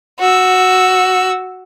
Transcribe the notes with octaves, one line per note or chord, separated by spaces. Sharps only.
F#4 E6